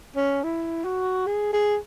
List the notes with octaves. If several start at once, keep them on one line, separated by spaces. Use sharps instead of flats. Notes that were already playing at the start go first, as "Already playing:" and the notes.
C#4
E4
F#4
G#4
G#4